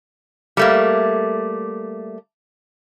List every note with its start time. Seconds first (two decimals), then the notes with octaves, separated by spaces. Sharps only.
0.57 G3 A3 A#3